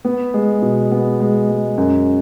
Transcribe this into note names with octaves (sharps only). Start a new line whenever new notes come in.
B3
G#3
B2
B3
G#3
G#3
F#2